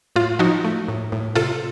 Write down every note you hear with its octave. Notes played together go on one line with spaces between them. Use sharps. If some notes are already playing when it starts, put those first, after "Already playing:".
A2 F4
F3 D#4 F#4
A3
A2
A2
C3 F4 A4